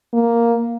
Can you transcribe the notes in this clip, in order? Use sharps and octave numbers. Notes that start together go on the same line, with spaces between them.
A#3